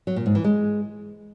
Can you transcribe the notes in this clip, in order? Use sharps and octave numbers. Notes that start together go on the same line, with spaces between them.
F#3
A#2
G#2
E3
G#3